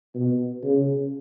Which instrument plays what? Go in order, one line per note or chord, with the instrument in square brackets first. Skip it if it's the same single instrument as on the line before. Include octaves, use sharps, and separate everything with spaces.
[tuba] B2
C#3